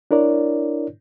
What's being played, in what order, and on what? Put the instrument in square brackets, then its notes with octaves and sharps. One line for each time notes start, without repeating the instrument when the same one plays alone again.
[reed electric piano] D4 E4 A#4 C#5 D5